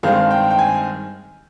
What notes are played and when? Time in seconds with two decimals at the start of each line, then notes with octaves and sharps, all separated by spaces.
0.03 G2 D#3 G#3 C4 F5
0.31 G5
0.50 G5
0.59 G#5